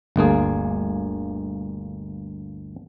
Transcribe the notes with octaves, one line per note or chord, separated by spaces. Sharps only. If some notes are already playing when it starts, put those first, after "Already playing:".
G1 D2 A#3 G#4